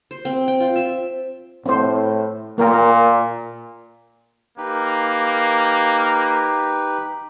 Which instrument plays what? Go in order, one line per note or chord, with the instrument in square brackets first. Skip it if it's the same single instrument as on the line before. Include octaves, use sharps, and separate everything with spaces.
[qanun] C5
C4
G5
F4
E5
[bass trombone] A2 [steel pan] C4 C5
[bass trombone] A#2 [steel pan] A#3 A#4 G5
[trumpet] A#3 [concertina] D#4 G4 B4